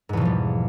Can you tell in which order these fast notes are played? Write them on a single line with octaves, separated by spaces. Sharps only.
G#2 E2 B2 F3 G3